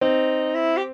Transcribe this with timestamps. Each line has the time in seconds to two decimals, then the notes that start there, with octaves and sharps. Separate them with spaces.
0.01 C4 D#4
0.55 E4
0.77 G4